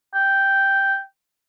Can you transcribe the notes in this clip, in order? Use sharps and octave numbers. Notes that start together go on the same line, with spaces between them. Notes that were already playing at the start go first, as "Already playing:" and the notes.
G5